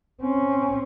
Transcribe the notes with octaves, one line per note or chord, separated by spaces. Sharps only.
C4 C#4